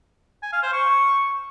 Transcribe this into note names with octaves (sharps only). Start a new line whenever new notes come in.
G#5
F5
C5
C#6